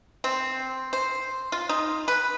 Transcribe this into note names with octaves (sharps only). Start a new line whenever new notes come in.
C4
C5
F4
D#4
B4